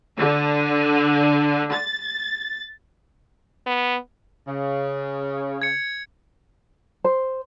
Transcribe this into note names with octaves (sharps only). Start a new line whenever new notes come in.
D3
A6
B3
C#3
G#6 C#7
C5